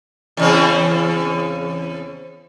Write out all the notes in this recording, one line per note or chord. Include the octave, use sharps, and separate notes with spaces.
E2 C#3 C4